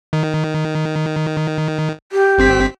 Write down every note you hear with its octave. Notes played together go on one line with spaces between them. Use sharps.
D#3
G4
G1 C4 B6